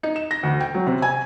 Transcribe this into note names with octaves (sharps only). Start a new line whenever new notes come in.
D#4
E7
A#6
D2
G5
F#3
C3
G#5